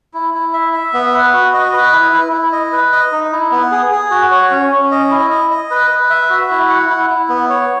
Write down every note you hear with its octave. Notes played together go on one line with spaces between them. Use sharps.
E4
E4
E5
E5
B3
B4
F#4
D#5
B4
E4
E4
E4
D#5
B4
D#5
D#4
E4
B3
G#4
G#4
F#4
C#5
C#4
C#4
D#5
E4
D#5
D#5
B4
B4
E5
F#4
E4
F#5
E4
E4
B3
C#5